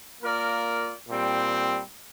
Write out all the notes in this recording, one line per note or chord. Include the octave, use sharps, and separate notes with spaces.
A#3 F4 A#4 D5
A#2 G3 C4